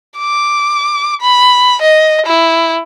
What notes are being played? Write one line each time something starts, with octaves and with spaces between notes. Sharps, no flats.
D6
B5
D#5
E4